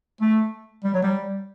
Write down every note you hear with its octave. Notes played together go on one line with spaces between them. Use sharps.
A3
G3
F#3
G3